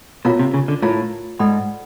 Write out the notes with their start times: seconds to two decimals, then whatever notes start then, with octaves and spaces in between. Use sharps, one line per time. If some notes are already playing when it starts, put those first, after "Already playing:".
0.25 B2 F4 A#4 C#5 F5 A#5
0.39 C3
0.54 C#3
0.68 D3
0.82 A2 F4 A#4 C#5 F5 A#5
1.39 G#2 A4 D5 F#5 B5